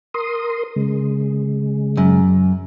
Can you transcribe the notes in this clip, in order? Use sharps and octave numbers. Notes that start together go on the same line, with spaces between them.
A#4 C6 D#6
C#3 G#3
F#2